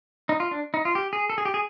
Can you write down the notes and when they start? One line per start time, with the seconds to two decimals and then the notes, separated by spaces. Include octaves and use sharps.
0.29 D#4
0.40 F4
0.51 D4
0.74 D#4
0.85 F4
0.95 G4
1.13 G#4
1.30 A4
1.38 G#4
1.45 G4
1.54 G#4